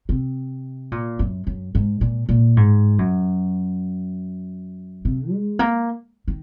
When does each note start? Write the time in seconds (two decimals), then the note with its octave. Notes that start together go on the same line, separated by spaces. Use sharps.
0.09 C3
0.92 A#2
1.19 F#2
1.47 F#2
1.75 G#2
2.01 A#2
2.29 A#2
2.57 G#2
2.99 F#2
5.05 C3
5.31 G#3
5.59 A#3
6.28 D#3